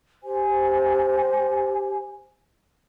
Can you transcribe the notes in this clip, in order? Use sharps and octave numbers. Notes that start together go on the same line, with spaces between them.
G4 C5 G#5